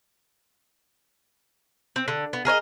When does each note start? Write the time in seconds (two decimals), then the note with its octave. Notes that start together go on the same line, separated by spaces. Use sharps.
1.96 C4
2.08 D3
2.33 B3
2.45 G#4 A#4 C#5 D#5